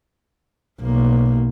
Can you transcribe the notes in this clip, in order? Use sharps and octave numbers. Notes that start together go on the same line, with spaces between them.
B1 A#3